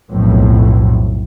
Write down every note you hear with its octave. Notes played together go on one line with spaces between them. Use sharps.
B1 F2 A2